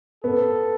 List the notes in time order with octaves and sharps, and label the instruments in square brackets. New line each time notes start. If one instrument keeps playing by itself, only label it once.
[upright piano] B3 [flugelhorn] A4